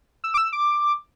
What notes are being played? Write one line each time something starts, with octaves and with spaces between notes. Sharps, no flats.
E6
D6
E6
D6